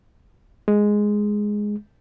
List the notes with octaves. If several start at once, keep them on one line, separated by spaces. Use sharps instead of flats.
G#3